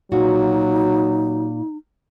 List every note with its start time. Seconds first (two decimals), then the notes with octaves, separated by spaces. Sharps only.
0.12 A#2 F#3 D#4 F#4